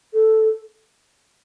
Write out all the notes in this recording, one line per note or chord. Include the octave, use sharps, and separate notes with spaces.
A4